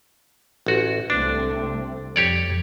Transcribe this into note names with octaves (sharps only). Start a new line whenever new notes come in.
A1 F#4
C2 A3 C4 D4
F2 G4 C#5 D5